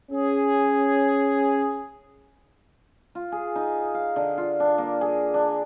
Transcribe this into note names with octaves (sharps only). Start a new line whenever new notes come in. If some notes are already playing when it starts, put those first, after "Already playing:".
C#4 G#4
F4
G#4
D#4
F5
D3
F4
D4
A#3
G#4
D4